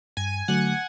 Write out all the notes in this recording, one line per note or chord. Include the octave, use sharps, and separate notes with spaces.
G2 G#5
D3 F#3 A3 F#5